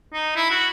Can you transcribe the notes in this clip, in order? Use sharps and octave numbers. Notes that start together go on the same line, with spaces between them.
D#4
E4
F#4